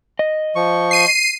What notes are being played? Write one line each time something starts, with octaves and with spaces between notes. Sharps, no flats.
D#5
F3 C#6
C7 D#7